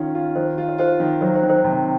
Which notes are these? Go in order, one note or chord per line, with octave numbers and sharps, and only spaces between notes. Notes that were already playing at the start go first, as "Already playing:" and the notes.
Already playing: D#3 C#4 F4
F4
D#3 C5
F4
C#5
F4 C5
D#3
F#3 C5
C5
D#3
C5
C3